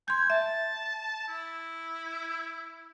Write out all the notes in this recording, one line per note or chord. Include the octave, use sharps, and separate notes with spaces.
G#5 C6 G6
E5 A5
E4